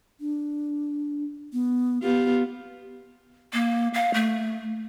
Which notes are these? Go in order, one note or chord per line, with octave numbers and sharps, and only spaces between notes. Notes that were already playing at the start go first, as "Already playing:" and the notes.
D4
B3
B3 F4 G4
A#3
F5
A3